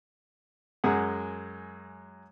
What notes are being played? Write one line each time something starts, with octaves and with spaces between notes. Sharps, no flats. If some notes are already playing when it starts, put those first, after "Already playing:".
F#2 G#3 G#4 F#5